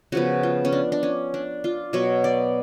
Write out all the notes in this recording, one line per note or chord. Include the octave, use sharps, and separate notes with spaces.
C#3 F3 B3 F#4
F4
C#4
D4
D4
C#4
D4
F4
B2 F#3 B3 C#5
D5